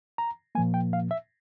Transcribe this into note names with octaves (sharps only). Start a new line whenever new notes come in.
A#5
A#2 F3 A#3 G#5
G5
F5
E5